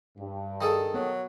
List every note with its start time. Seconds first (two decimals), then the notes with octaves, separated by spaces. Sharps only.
0.17 G2
0.61 D#3 G#4 A4
0.94 F#3 B3